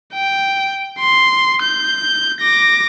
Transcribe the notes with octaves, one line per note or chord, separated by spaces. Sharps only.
G5
C6
G6
D6 A#6